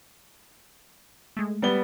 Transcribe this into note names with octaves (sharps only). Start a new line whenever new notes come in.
G#3 A3
G3 B3 G7